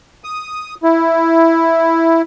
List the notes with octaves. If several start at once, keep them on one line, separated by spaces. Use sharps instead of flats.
D#6
E4